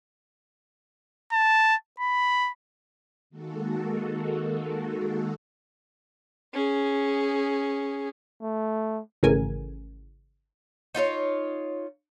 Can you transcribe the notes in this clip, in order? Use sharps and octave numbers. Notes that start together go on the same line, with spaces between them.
A5
B5
D#3 G#3 A#3 F#4 A4
C#4 G#4
A3
G#1 C#3 E3 A3 A#4 G#5
D#4 F4 B4 C#5